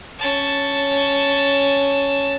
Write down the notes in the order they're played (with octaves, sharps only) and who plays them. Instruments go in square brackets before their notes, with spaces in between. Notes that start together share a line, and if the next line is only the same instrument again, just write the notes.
[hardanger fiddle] C#4 A5